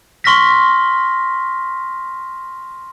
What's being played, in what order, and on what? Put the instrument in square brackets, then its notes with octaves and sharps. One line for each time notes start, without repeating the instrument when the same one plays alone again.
[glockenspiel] C6 C#6 F6 A#6 B6